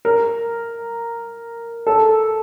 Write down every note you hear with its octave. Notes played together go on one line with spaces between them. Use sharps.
A#4
A4